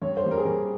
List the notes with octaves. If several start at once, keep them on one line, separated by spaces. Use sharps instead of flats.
G2 C#5
C5
G3 A#3
A#4
G#4
G2 A#4